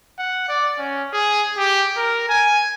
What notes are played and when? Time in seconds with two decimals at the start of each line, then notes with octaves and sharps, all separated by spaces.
0.19 F#5
0.49 D5
0.78 C#4
1.13 G#4
1.58 G4
1.97 A#4
2.29 G#5